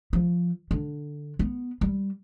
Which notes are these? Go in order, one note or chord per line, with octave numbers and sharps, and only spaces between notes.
F3
D3
B3
G3